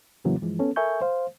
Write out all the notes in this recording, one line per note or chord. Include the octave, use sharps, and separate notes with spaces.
F2 A2 C#3 E3 F#3 A#3
G2 E3 F3 G#3
B3 C#4 A4
A4 A#4 E5 G#5 C#6 G6
C5 F5